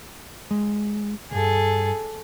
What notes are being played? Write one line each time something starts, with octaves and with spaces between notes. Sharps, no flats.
G#3
C2 G2 G#4 A4